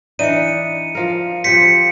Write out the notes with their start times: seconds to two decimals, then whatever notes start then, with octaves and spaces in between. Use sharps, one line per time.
0.19 E3 D4 D#4 C#7 D#7
0.95 F3 A#4
1.44 F3 G4 C5 B6 C#7